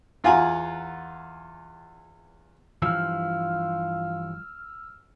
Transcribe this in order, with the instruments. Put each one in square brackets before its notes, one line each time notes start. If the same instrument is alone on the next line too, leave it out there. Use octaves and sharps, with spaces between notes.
[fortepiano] E2 F4 F5 F#5 G#5 A#5
[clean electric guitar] G2 E3 F3 [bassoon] F4 [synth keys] E6 F6